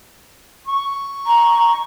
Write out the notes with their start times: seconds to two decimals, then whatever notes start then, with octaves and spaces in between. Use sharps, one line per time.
0.67 C#6
1.27 A#5